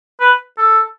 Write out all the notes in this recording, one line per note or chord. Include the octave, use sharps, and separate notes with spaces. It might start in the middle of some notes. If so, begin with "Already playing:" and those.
B4
A4